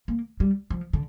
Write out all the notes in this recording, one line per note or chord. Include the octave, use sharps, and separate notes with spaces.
A#3
G3
F3
D3